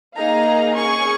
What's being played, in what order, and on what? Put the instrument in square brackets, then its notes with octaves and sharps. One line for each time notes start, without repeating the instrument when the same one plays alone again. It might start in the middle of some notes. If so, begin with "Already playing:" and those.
[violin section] A#3 D#4 G#4 F5 A#5
C#4 G#4 G#5 C#6